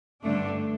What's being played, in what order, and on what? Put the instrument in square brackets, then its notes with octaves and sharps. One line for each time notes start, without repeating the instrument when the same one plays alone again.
[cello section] G2 D3 A3 D4